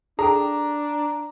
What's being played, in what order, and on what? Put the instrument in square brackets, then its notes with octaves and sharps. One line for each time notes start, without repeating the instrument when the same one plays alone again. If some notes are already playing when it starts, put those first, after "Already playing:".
[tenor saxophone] D4 [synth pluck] G#4 A4 G5 [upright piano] A#5